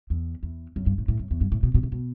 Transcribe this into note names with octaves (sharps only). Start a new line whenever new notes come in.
E2
E2
F#2
G2
A2
A2
F#2
E2
G2
A2
B2
B2
C3
B2